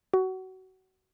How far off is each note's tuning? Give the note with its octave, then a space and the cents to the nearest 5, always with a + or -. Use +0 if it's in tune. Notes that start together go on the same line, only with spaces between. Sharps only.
F#4 +25